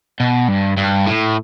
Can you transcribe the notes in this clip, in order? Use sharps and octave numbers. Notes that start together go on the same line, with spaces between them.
B2
G2
G2
A2